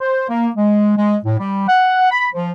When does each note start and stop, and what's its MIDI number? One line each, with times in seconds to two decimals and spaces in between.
0.01 0.28 72
0.29 0.48 58
0.56 0.95 56
0.97 1.16 56
1.25 1.38 45
1.39 1.64 55
1.68 2.10 78
2.11 2.28 83
2.34 2.50 53